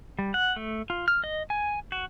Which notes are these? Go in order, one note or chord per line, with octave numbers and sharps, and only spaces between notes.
G3
F#5
A3
F4
F6
D#5
G#5
F#4